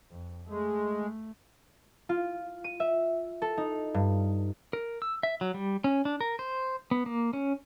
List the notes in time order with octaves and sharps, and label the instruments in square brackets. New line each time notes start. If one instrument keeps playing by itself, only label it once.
[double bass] F2
[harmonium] G#3 [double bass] A3
[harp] F4
D#7
E5
A4
D#4
G2
[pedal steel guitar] A#4
E6
E5
F#3
G3
C#4
D4
A#4
C5
B3
A#3
C#4